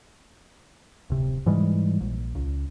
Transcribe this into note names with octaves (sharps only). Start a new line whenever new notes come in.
D1 C3
G#2 E3 G3 G#3
A#1
C#2